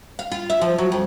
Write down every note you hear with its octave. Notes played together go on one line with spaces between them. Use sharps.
F5
F4
E5
F3
F#3
F2